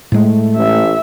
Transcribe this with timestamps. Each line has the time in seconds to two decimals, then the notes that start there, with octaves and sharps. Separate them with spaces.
0.12 A2 G#3 A3
0.57 A1 E5